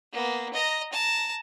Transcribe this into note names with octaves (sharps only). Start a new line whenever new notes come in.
A#3 B3
D#5 A#5
A5 A#5